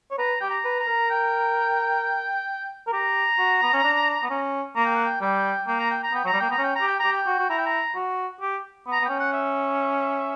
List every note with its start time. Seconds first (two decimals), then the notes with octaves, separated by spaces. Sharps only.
0.11 C#5
0.18 B4 A#5
0.41 G4 G5
0.50 A#5
0.65 B4
0.80 A#5
0.87 A#4
1.10 G5
2.87 A#4
2.93 G4 A#5
3.39 F#4
3.63 B3
3.73 C#4
3.84 D4
4.23 B3
4.30 C#4
4.76 A#3 A#5
4.85 G5
4.95 F#5
5.05 G5
5.21 G3 G5
5.67 A#3 G5
5.79 A#5
5.91 G5
6.03 A#5
6.13 B3 G5
6.25 F#3 A#5
6.33 G3
6.40 A#3 G5
6.50 B3 A#5
6.58 C#4
6.63 G5
6.76 A#5
6.81 G4
6.88 G5
6.99 G4 A#5
7.11 G5
7.27 F#4
7.39 F#4
7.50 E4 A#5
7.58 G5
7.66 A#5
7.95 F#4
8.41 G4
8.87 B3
8.92 A#5
9.01 B3
9.05 C#4 G5
9.20 F#5
9.33 E5